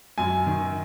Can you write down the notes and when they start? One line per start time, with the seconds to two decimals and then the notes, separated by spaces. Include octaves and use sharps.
0.18 F#2 G#5
0.47 D#3